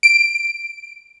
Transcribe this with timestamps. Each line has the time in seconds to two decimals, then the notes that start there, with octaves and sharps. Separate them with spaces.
0.03 D7